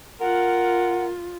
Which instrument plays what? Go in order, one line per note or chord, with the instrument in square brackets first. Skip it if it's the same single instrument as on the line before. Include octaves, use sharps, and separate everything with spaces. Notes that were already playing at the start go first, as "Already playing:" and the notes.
[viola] F4 [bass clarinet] A#4 [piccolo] F#5